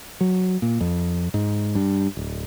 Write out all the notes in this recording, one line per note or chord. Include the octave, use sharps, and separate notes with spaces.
F#3
A#2
F2
G#2
G2
D1